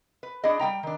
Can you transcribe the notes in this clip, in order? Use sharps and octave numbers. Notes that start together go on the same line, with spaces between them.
B4
D4 E4 G#4 D#5
G3 A#3 G5 A#5
D#3 D4